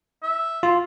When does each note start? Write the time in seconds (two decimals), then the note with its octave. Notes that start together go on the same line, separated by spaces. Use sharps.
0.23 E5
0.63 F4